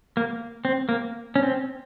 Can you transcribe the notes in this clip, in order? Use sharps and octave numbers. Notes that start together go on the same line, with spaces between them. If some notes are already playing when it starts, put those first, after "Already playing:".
A#3
C4
A#3
C#4
C4